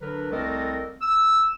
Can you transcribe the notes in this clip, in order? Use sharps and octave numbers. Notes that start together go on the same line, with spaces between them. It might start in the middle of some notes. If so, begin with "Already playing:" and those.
D3 F#3 D4 A#4 B4
C2 A3 C4 A4 A#4 D#5
E6